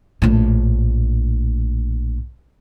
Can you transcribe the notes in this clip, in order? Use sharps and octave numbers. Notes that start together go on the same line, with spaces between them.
A#1 A2